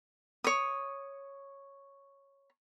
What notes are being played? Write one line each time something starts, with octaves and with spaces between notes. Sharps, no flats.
C#5 D#6